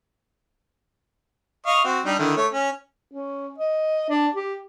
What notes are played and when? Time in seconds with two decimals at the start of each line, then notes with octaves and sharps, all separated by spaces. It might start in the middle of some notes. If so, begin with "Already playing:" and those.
1.66 D#5 F5 C#6
1.84 C4 F#4
2.05 G3 D4 D#4
2.19 D3 D#3 E4
2.37 A3 C#5
2.53 C#4
3.12 C#4
3.58 D#5
4.09 D4
4.35 G4